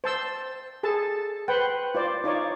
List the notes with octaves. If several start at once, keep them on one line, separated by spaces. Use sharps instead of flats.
C5 A5 E6
G#4 A4 A5
B4 C5 F#5 G5
F4 C5 D5
D#4 F4 C#5 D5